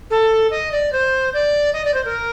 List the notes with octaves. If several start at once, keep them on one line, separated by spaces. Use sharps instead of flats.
A4
D#5
D5
C5
D5
D#5
D5
C5
A#4